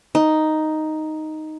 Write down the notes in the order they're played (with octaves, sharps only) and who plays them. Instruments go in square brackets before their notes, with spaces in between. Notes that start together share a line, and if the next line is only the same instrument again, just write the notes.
[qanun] D#4